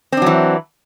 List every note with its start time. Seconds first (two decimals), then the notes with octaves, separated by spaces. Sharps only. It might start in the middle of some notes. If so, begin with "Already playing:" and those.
0.12 C4
0.17 D4
0.22 F#3
0.26 E3